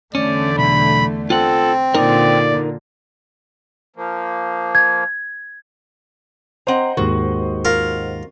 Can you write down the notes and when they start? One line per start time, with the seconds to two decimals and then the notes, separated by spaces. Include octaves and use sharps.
0.15 E2 D3 A3 C#4 D5
0.58 B1 B5
1.30 C4 F4 A4 F#5
1.94 A#2 D3 D#4 A#4 D5
3.96 F3 A#3
4.75 G#6
6.67 C4 C5 D#5 F#5 A#5
6.97 D#2 G#2 D#3 F#4
7.65 F4 A#4